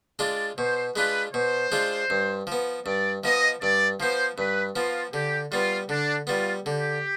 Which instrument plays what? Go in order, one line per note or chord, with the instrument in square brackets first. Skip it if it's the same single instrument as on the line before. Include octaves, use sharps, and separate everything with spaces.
[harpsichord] G#3 D4 F4 [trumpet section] D5
[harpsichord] B2 [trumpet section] C5
[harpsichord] G#3 D4 F4 [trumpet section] B4
[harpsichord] B2 [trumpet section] C5
[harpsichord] G#3 D4 F4
G2
F3 B3
[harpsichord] G2 [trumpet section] D5
[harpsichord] F3 B3 [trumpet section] D#5
[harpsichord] G2 [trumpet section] D5
[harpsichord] F3 B3 [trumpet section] C5
[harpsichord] G2 [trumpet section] B4
[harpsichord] F3 B3 [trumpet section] F4
[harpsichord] D3 [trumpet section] G4
[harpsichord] G3 B3 [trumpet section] F4
[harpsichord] D3 [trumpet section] D4
[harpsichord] G3 B3 [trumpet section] F4
[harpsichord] D3 [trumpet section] G4